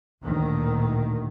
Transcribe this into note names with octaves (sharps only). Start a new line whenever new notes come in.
A1 D2 A#2 D#3